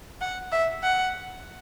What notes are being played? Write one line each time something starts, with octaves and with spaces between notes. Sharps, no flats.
F#5
E5
F#5